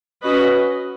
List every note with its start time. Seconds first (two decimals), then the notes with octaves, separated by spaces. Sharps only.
0.23 C#4 F#4 B4 D#5